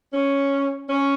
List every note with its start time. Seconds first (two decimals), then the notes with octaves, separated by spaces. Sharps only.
0.13 C#4
0.90 C#4